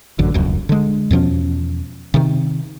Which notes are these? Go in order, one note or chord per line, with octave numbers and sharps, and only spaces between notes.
A1 F#2 D3
D#1 C#2 F#2
D3 G#3
E2 B2 F3 C#4
C3 D#3